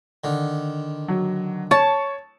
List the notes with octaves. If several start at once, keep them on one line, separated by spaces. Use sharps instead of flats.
D3 D#3
F#3
C#5 A5 C#6